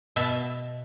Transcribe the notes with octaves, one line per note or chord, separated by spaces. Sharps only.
B2 E5 A5